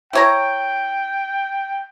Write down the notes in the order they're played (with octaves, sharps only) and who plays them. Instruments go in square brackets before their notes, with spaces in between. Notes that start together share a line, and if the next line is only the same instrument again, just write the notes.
[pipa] E4 C#5 A#5 [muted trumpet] G5